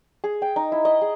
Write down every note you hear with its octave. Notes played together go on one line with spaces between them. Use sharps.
G#4
G5
D#4
E4
D#5
G#4